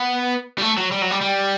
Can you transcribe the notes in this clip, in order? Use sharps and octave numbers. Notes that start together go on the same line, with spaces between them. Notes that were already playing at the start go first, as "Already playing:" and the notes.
Already playing: B3
G3
A3
F#3
G3
F#3
G3
G3